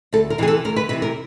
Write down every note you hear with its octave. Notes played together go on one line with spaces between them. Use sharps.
D2 A4
A#4
C3 E3 G#4
A4
D2 A#4
B4
C3 E3 B4
A#4